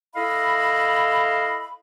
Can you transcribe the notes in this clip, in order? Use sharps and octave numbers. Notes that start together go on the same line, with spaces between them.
E4 A4 D#5 F5 B5